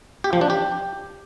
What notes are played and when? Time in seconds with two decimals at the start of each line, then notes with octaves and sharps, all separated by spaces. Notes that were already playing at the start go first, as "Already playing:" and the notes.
0.24 G4
0.33 F3
0.41 D4
0.50 G4